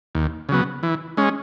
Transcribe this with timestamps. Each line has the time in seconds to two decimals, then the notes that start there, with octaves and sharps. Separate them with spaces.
0.15 D#2
0.49 C#3 F#3 B3
0.83 E3
1.17 G#3 C#4